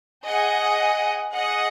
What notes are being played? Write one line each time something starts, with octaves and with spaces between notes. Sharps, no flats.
G#4 D#5 F#5
G#4 D#5 F#5